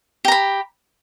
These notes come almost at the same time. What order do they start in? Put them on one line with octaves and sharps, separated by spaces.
G4 A#5 B5